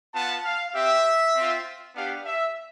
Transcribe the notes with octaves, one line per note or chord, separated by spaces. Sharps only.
B3 F4 A5
F5
C4 G4 E5
C4 F4
B3 D4 G4 F5
E5